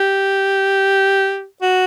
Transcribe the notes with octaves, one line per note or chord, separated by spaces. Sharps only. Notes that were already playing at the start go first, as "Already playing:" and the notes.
Already playing: G4
F#4